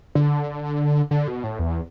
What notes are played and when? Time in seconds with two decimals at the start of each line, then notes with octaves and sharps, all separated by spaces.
0.15 D3
1.11 D3
1.28 B2
1.44 A2
1.59 E2